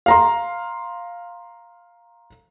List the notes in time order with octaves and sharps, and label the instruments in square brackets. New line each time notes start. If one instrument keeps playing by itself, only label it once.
[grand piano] F5 A#5 C6